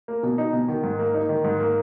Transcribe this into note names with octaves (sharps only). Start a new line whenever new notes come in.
A#3
B2
D#4
B2
D#3
G#2
A#3
D#4
D#3
G#2
A#3